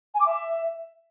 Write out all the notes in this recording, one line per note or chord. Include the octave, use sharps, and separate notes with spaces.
G#5
D6
E5